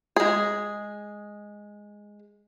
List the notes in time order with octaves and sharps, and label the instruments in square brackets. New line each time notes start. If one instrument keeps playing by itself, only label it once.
[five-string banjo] G#3 G#4